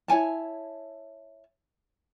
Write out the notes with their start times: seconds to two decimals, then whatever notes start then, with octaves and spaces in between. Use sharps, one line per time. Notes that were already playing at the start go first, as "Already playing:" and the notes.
0.08 E4 C#5 G#5 A5